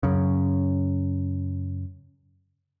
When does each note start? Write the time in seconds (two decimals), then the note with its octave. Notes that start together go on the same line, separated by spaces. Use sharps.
0.03 F#2 C#3